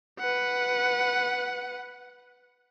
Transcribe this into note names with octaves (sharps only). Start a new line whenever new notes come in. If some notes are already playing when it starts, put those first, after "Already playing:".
B4 F#5